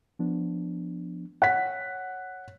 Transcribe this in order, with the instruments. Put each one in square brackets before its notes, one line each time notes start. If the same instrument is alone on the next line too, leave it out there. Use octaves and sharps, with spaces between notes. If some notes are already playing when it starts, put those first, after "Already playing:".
[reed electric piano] F3 B3 D4
[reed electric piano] C#5 [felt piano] F#5 B6